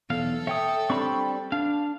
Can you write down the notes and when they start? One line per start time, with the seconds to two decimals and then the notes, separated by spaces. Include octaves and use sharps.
0.10 B1 E2 A4 F5
0.47 C#5 E5 G5 D#6
0.90 G3 C4 D4 G5 B5 C#6
1.52 D4 F5